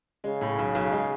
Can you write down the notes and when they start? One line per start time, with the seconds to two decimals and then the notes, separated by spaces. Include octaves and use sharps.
0.24 C#3 G#3
0.41 A2
0.59 B1
0.75 B1
0.92 G#3